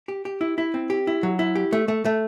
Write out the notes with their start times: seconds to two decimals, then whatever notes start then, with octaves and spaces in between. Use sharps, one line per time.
0.08 G4
0.25 G4
0.41 E4
0.58 E4
0.74 C4
0.90 G4
1.07 E4
1.23 F#3
1.39 E4
1.55 G4
1.73 A3
1.88 A3
2.05 A3